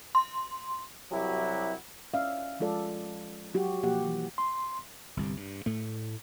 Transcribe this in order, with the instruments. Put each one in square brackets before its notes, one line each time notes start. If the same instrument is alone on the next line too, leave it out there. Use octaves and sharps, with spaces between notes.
[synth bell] C6
[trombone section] C2 F#3 E4 F#4 G4
[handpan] C#4 D5 E5 F5
F3 G#3 F4 A4 D5
F#3 F#4 G4
B2 F3 A#3 G4 F#5
E3
[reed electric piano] C6
[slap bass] G1 C2 G2
G2
A2 A3